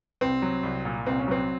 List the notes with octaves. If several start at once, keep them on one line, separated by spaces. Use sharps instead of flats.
C2 C4
F#3
C2
A#2
C2 C4
C#4
F#3 C4